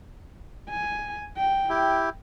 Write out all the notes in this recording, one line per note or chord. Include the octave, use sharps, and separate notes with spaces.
G#5
G5
E4 G4